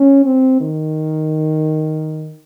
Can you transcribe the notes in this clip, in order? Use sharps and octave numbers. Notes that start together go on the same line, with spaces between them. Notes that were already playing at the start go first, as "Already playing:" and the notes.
Already playing: C#4
C4
D#3